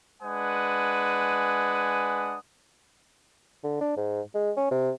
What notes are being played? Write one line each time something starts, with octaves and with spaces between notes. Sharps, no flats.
G#3 D4 B4 F#5 G#5 D#6
D3
D4
G#2
G#3
C#4
C3